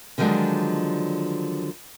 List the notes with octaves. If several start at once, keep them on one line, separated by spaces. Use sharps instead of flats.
D3 D#3 F3 F#3 G#3 D4